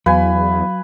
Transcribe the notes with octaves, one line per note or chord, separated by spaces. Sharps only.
E2 F#3 B4 F5 G#5